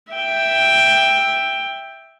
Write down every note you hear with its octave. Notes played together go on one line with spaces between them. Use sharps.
E5 G5